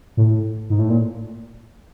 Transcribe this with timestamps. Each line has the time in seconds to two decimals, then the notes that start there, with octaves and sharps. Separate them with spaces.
0.17 A2
0.70 G#2
0.79 A2
0.90 A#2